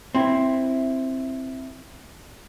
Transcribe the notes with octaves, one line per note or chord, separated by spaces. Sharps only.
C4 E4